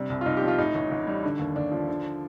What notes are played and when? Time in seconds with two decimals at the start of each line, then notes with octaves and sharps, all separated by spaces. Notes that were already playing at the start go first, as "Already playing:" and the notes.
Already playing: C3 G3 D4
0.10 C2
0.21 F4
0.26 C2 D#4
0.37 G4
0.42 F3
0.48 F4
0.58 A2 D#4
0.75 A1
0.91 A1
1.07 G3
1.24 D3
1.39 D#2
1.56 D#2 D4
1.72 F3
1.88 D3